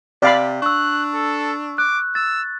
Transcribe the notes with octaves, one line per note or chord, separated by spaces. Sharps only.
C3 D5 F5 B5
D4 C#6 E6 F#6
A4
D6 F#6
E6 A6